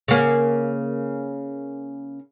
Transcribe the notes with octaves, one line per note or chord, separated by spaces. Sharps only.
C#3 A#3